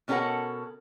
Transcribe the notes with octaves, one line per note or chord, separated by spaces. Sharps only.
B2 C#4 G4 A4 A#4 F#5